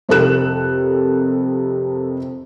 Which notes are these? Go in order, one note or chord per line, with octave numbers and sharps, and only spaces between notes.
F2 C3 A4 A#4 F#6 E7